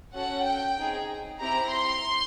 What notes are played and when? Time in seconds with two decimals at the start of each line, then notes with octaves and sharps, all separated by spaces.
0.14 C#4 F#4 A4 F#5
0.45 G5
0.78 C4 D#4 G#4
1.40 C4 E4 G4 A#5
1.71 C6